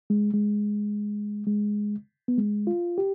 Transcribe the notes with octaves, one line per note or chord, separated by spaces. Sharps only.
G#3
G#3
G#3
B3
G#3
F4
G4